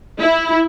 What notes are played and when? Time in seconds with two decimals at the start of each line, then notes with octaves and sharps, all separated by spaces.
0.20 E4